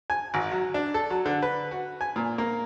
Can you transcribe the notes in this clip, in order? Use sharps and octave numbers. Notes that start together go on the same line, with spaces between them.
G#5
G#1
F#3
D4
A4
F#3
D3
B4
F#4
G#5
A#2
A#3